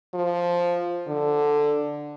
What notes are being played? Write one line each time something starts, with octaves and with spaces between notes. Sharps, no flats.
F3
D3